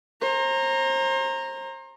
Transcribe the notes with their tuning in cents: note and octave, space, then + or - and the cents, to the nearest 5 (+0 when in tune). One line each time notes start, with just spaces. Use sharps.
C5 +35 A#5 -5